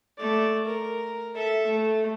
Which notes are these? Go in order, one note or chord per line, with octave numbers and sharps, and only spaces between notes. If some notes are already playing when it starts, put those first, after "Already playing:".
A3 D5
A#4
A4 E5
A3